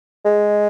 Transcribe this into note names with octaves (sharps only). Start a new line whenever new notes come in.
G#3